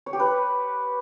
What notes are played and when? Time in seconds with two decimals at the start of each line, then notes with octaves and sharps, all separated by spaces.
0.06 C#5
0.13 G4
0.20 B4